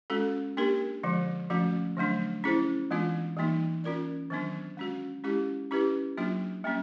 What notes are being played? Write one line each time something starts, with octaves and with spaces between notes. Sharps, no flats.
G#3 C#4 F#4 A4
A#3 D4 G4 A#4
D3 F3 G#3
F3 A3 C#4 F#4
D3 F#3 A3 D4
C#4 E4 G#4 C5
E3 G#3 B3 D4 F4
E3 G3 A#3 D#4
C#4 F4 A#4 D5
D#3 F#3 B3 D4
G#3 C#4 F#4
G#3 C#4 E4 G4
C#4 E4 G4 B4
F#3 A#3 D4 F4
G3 A#3 C#4